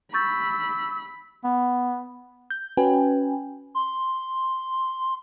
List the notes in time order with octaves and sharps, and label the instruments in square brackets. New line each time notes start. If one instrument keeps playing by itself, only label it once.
[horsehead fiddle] B5 [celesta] C#6 G6 A6 [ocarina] E6
[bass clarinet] B3
[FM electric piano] G6
C#4 F#4 B4 G5 G#5
[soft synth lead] C6